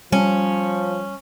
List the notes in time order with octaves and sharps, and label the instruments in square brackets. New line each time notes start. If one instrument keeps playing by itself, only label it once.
[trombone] F3 [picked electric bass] G3 [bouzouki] C#4